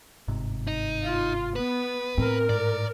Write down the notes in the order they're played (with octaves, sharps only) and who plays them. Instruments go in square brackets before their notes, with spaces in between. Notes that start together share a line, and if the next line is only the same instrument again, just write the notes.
[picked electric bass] G1 G#2 C3
[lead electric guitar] D#4
[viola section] F4
[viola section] B3 [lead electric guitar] B4
[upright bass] A2 [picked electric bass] C4 [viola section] A#4
[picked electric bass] G#2 [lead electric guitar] D5